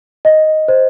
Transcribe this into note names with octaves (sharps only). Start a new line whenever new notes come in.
D#5
C5